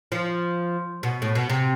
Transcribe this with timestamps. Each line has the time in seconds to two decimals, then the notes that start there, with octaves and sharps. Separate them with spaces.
0.12 F3
1.03 B2
1.22 A2
1.35 B2
1.50 C3